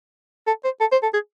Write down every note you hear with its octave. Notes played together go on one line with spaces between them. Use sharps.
A4
C5
A4
C5
A4
G#4